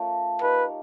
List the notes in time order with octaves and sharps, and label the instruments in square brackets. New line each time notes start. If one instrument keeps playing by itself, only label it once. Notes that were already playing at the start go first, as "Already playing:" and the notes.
Already playing: [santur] A3 C#4 F4 A#4
[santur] D#4 G4 A#4 [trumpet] B4